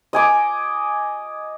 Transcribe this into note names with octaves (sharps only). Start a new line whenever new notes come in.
D#5 G#5 D6